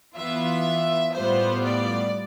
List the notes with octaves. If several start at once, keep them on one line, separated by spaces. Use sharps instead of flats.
E3 B3 F4 E5
A2 G3 B3 F4 C5
D5